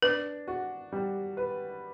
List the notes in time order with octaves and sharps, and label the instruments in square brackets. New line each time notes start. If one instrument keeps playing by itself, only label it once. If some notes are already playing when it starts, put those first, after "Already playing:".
[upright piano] D4 [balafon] B4
[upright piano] F#4
G3
B4